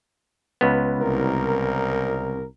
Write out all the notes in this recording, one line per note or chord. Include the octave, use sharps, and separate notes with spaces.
C#2 B3
C2 A#4